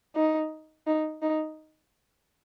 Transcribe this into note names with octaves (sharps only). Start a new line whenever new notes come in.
D#4
D#4
D#4